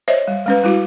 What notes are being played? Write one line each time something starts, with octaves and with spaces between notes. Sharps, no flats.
C5 C#5 D#5 E5
G3
G#3 C#4 B4
G3 E4 F#4